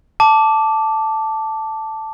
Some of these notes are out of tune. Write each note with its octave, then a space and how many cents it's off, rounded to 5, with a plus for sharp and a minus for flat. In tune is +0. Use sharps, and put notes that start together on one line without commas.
A5 +0 D6 -5